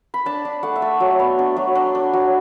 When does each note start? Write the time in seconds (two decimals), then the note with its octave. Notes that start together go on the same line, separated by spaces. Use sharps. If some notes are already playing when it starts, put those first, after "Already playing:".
0.14 B5
0.26 D4 A5
0.45 D4
0.63 A3 F#5
0.76 E5
0.82 A3
1.00 F#3
1.20 B3
1.39 D4
1.57 F#3
1.75 D4
1.95 D4
2.13 F#3